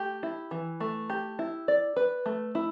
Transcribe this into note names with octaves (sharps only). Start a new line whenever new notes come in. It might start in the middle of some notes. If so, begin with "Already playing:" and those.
Already playing: A3 G4
E4
E3
A3
G4
E4
D5
B4
A3
E4